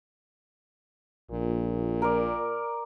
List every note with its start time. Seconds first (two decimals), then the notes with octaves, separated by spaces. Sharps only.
1.31 A#1 A#2
2.02 A#4 D5